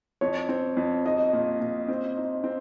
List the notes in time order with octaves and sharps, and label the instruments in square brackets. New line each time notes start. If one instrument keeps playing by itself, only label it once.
[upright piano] F2 [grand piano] C#5
[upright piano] C4
F2
[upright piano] D#4 [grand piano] D#5
[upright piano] A#2
A#2
C4
D#4
C4